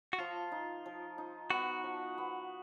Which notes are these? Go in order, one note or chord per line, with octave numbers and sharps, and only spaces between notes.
F#4
F3 F4
D#4
F3
D#4
B3 F#4
F3
B3